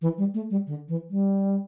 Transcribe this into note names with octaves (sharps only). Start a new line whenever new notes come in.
E3
G3
A3
G3
D3
E3
G3